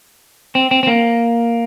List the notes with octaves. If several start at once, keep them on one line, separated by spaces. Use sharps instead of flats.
C4
C4
C4
A#3